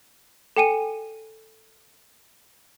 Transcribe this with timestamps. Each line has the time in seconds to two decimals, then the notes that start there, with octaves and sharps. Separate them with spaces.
0.57 A4 G5 G#5 D#7